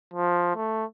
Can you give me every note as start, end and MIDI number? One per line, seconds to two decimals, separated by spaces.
0.14 0.51 53
0.55 0.85 57